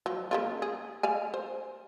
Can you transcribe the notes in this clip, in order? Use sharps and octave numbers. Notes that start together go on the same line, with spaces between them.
F3 F#3
C#3 A#3 F4
G#4
D5 F5 G#5
C5